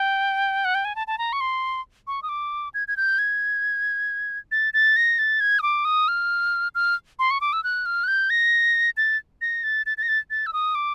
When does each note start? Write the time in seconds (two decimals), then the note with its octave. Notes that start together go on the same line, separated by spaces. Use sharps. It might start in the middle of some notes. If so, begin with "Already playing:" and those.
Already playing: G5
0.65 F#5
0.75 G5
0.85 G#5
0.96 A5
1.07 A5
1.18 A#5
1.33 C#6
1.41 C6
2.07 C#6
2.23 D#6
2.29 D6
2.74 G#6
2.88 G#6
2.97 G6
3.19 G#6
4.52 A6
4.74 A6
4.96 A#6
5.19 A6
5.40 G#6
5.59 D#6
5.63 D6
5.85 D#6
6.08 F6
6.75 F6
7.19 C6
7.31 C#6
7.41 D6
7.53 E6
7.64 F#6
7.86 F6
8.04 F#6
8.08 G6
8.30 A#6
8.97 A6
9.41 A#6
9.64 A6
9.86 A6
9.98 A6
10.03 A#6
10.08 A6
10.30 A6
10.46 E6
10.53 D#6
10.75 D6